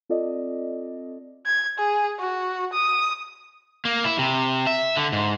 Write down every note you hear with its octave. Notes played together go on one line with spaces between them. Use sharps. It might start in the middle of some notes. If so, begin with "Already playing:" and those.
C4 F4 A4 D5 D#5
G#6
G#4
F#4
D#6
A#3
E4
C3
E5
D3
G#2